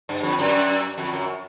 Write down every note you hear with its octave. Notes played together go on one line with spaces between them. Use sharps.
G2
F2
F#2
F2
F#2